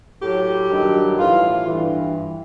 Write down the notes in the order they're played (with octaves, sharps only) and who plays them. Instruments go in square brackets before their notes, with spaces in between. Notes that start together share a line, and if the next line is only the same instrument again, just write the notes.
[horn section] A2 F#3 G4
G2 D#3 F#3
A2 E3 F4
G2 E3